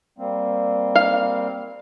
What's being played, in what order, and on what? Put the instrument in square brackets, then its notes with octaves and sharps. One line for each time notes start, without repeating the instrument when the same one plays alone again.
[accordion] G3 A#3 C4
[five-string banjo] F5